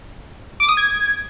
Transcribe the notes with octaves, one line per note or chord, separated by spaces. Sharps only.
D6
D#6
G#6